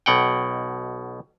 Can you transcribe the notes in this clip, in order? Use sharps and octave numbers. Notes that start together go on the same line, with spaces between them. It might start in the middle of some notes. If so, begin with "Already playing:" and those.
B1 B2 F#5 G5